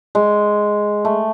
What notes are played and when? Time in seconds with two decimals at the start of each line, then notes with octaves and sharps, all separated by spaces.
0.15 G#3
1.05 A3